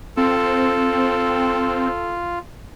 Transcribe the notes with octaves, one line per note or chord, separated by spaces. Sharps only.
C4 F4 A4